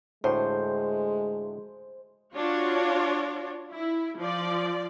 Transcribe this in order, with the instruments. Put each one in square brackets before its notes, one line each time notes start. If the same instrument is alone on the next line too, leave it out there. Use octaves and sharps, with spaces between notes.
[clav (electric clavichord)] D2 A2 [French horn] G#3 [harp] C5
[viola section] D4 F4 F#4 C#5
E4
F3 D5